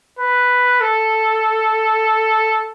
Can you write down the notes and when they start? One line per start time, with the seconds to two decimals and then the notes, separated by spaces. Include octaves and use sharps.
0.19 B4
0.81 A4